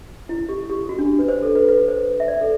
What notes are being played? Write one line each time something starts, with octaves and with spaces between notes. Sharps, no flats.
E4
G4
G4
F#4
D4
B4
C5
A4
B4
B4
C5
E5
D5
A4